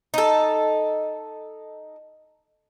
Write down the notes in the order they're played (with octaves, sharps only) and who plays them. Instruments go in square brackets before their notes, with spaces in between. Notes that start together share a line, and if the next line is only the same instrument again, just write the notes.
[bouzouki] D#4 A4